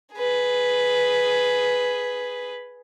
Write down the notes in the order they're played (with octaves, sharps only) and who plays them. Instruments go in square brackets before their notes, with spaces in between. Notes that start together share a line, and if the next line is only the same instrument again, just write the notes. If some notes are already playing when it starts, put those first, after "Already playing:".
[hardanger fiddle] G#4 B4